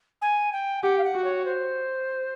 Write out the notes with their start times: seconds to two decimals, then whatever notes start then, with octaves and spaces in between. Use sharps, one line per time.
0.22 G#5
0.52 G5
0.83 G4 F#5
0.98 F5
1.04 F#5
1.14 F#4
1.24 C#5
1.45 C5